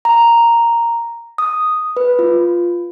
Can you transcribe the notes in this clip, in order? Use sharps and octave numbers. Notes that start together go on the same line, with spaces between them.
A#5
D#6
B4
F4